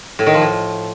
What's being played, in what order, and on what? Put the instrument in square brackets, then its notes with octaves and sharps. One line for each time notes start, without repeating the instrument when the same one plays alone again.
[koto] A2
D#3
F3
A2